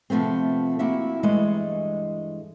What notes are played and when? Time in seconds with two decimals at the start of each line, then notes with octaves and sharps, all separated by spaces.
0.10 C3 F3 A3 B3 C4
0.79 A#3 C4 E4 F#4 E5
1.23 G2 E3 G#3 A3 D#5